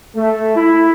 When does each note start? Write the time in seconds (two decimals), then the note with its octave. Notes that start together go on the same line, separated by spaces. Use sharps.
0.15 A3
0.55 E4